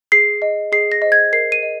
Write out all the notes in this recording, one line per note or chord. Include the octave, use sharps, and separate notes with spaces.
G#4 C7
D#5
G#4 C7
A#6
C5 D#5
G#6
A#4 C7
D#7
D#5